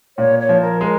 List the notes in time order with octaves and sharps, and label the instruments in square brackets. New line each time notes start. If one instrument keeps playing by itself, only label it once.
[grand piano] A#2 [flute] C#5
[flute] C#5
[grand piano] F3
[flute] A#4
[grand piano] G#3 [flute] A#4